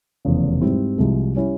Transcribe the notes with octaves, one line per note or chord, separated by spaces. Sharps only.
F1 E2 C#3
G#2 G3 C4 E4
C2 C3 F3 G#3
G3 C#4 E4